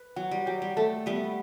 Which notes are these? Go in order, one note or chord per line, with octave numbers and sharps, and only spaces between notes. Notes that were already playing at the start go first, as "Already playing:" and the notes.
Already playing: B4
F#3 F#5
G3
F#3 G4
G3
A3 A4
G3 B3 E5